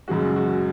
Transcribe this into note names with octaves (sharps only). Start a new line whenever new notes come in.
F#1 F#2 C#3 G#3 F#4
F#4